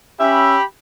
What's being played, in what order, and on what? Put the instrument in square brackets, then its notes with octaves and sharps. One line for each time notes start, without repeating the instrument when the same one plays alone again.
[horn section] C#4 E5 [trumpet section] G4 B5